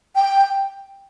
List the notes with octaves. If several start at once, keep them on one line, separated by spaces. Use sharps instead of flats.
G5